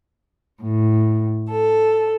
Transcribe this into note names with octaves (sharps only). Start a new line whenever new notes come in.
A2
A4